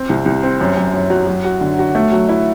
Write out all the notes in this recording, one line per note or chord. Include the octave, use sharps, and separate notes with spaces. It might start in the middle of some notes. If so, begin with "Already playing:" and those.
Already playing: C4
C2
C2
C4
F#2
F#2
F#2
F#3
F#3
F#4
D3
F#4
A3
F#3
E4